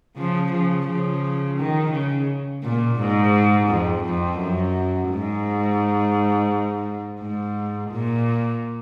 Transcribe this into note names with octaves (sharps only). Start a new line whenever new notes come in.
C#3 F3
C#3 F3
C#3 F3
D#3
C#3
A#2
G#2
F2
F2
F#2
G#2
G#2
A#2